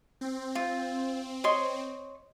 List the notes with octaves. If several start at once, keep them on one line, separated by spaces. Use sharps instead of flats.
C4
F4
C#5 D#5 C6